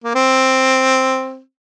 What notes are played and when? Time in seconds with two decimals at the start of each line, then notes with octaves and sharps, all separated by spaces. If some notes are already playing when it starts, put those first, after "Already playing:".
0.04 A#3
0.15 C4